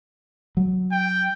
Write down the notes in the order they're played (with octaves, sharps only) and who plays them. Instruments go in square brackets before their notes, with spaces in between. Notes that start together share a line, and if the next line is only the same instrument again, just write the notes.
[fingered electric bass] F#3
[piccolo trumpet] G5